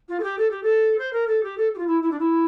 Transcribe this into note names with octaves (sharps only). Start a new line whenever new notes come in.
F4
A4
G4
A4
G4
A4
C5
A#4
A4
G4
A4
G4
F4
E4
E4
D4
E4